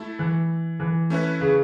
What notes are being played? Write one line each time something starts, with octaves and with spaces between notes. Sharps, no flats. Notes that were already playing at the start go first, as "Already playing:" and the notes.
Already playing: A3 E4 A4
E3
E3
A3 C#4 E4 B4
C#3